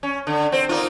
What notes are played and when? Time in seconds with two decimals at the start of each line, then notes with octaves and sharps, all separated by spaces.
0.03 C#4
0.27 D3
0.52 C4 C5
0.69 A#3 D#4 F4